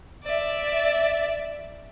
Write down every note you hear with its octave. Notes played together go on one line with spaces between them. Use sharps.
D5 E5